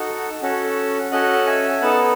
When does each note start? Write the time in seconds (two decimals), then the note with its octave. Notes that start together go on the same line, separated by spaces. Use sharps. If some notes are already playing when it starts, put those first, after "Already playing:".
Already playing: D#4 F#4 A4
0.42 C#4 F#4 A4
1.11 C#4 F#4 A4 D#5 F#5
1.46 E5 G#5
1.81 B3 D#4 A4 F#5 A5